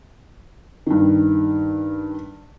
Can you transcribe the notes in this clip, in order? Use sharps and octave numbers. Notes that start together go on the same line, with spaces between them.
G2 D#3